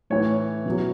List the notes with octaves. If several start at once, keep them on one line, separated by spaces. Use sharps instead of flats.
A2 E3 C#5
B2 F#3